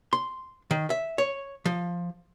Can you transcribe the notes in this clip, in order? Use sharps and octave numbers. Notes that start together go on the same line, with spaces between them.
C6
D#3
E5
C#5
F3